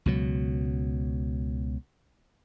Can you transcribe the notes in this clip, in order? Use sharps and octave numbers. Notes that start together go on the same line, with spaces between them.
C#2 B2 F#3